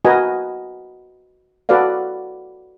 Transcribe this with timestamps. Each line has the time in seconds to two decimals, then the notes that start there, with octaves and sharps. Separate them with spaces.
0.05 F#4 A#4 B4 D#5 G#5
1.69 F#4 A4 B4 D5 F5